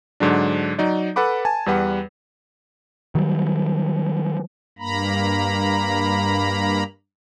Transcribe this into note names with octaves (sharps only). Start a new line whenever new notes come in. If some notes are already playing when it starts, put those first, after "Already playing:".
G#2 D3 F#3 D4
F#3 D#4 D5
A4 B4 F#5 B5 D6
G#5 A5
E2 G3 B4 F#5
D#3 F#3 G3
G2 A#3 A#5 B5